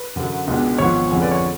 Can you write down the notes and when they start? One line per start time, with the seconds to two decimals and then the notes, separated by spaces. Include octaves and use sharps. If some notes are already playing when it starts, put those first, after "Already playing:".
Already playing: B4
0.16 F#2 D3 F#3
0.47 C#2 B2 G#3 B3 D4
0.78 G#1 G#2 F3 B3 C#5
1.10 F2 D3 G#3 C#4
1.21 B4 D5
1.31 C#5